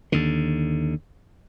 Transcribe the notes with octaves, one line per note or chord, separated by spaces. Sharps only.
D#2 D3